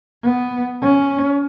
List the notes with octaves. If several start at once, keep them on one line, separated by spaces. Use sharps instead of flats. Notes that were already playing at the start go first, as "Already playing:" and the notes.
B3
C#4